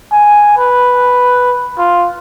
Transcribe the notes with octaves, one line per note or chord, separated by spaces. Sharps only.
G#5
B4
F4